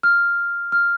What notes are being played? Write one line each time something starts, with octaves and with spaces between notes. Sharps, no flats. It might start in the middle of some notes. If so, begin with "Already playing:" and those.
F6
F6